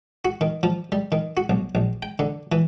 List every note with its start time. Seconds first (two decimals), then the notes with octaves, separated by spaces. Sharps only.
0.25 F#4
0.41 D#3
0.63 F3
0.92 G3
1.12 D#3
1.37 F#4
1.49 B1
1.75 A#1
2.02 G5
2.19 D3
2.52 E3